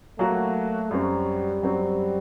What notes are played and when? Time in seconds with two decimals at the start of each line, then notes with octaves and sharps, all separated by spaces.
0.18 F#3 A3 A#3 F#4
0.91 F#2 F#3 G3 C4
1.62 F#2 F#3 C4